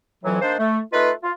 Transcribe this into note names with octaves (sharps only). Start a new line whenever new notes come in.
F2 A2 E3 F#3
D#3 A#3 D4 C5
A3
A3 D#4 F4 B4
F4